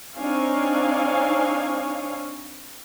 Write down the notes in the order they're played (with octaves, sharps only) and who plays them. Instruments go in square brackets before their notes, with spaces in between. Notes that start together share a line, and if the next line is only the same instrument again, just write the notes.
[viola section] C4 D4 D#4 C#5 F5 G#5